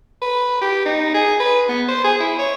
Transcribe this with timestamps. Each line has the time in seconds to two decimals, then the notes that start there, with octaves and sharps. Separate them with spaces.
0.22 B4
0.61 G4
0.85 D#4
1.14 G#4
1.40 B4
1.68 B3
1.88 C5
2.04 G#4
2.20 E4
2.38 C#5